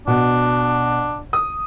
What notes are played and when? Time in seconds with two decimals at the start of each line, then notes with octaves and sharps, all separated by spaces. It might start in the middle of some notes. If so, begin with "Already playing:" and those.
0.07 B2 D4
1.33 D#6